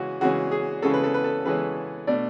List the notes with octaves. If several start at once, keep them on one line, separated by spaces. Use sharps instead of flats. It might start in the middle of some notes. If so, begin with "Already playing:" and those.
Already playing: C#3 E3 G#3 C#4 F#4
C#3 E3 G#3 C#4 F#4
G#4
C#3 E3 G#3 C#4 A4
B4
A4
B4
A4
C#3 E3 G#3 C#4 B4
B2 A3 D4 D5